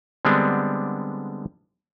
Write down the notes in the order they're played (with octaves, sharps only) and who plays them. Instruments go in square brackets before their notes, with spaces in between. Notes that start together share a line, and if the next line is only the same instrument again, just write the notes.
[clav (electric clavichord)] D3 G3 G#3 B3 C4 D4